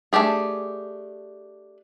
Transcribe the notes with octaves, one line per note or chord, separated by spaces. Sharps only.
A3 D4 G4 G#4